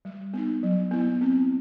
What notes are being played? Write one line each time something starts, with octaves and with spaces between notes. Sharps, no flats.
G3
B3 D#4
F#3
B3 E4
C4